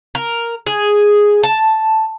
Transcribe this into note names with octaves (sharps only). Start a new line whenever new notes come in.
A#4
G#4
A5